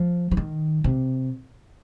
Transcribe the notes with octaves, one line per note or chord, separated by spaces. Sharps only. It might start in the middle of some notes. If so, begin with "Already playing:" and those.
Already playing: F3
F3
D#3
C3